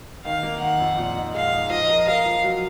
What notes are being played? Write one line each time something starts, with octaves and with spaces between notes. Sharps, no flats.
D#3 F5
A#3
D#3 F#5
F2
A#2
D#4
G#3 F5
D#4
F3 D#5
A#4
A#4 F5
F3
F#3